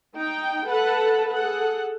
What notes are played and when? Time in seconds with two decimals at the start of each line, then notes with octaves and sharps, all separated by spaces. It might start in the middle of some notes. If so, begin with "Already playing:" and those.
0.14 D#4 G5
0.66 A4 B4 F#5 A5
1.32 G#4 A4 F#5